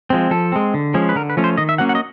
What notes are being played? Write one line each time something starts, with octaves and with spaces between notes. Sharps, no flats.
F3 G#3 C4
F3 A4
G#3 C4
D3
F3 G#3 C#4
B4
D3 A#4
B4
F3 A3 C#4
C5
D#3 D#5
E5
F#3 A#3 C#4 F#5
F#5
D#5